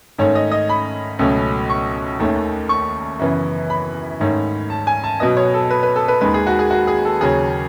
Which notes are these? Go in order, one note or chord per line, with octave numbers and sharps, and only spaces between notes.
G#2 D#3 A3 C#4 C#5
D#5
D#5
B5
C#2 B2 F#3 A3 C#4
C#6
D#2 D#3 A3 C#4
C#6
F#2 C#3 E3 B3
B5
G#2 D#3 A3 C#4
A5
G#5
A5
B2 F#3 B3 D#5
C#5
A4
B4
B4
A4
B4
D#2 D#3 G#3 B4
G#4
F#4
G#4
F#4
G#4
A4
D#2 C#3 F#3 C#4 G#4